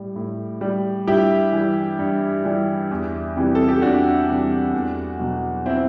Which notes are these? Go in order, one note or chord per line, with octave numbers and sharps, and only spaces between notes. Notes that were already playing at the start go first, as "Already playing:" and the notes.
Already playing: A2 G3
A2
G3
G2 E4 G4
E3 G3
G2
E3 G3
E2
C3 E3 G3
A4
G4
E2 D4 F#4
C3 E3 G3
E2
B2 F#3
C4 E4